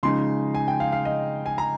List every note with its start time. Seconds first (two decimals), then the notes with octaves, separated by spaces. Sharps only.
0.03 C#3 F3 G#3 D#4 C6
0.55 G#5
0.68 G5
0.80 F5
0.92 F5
1.05 D#5
1.46 G#5
1.58 A#5